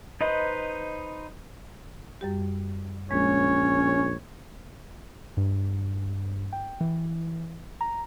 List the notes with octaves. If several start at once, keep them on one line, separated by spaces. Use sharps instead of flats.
D#4 B4 C5 D#5
F#2 G3 G4
A#1 G#3 C#4 C#5
G2
G5
E3
A#5